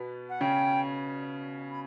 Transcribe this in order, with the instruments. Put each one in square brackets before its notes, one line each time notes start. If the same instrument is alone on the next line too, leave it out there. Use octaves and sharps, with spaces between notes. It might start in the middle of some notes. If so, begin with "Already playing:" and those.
Already playing: [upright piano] B2 B3
[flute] F#5
[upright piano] C#3 C#4 [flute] G5
[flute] B5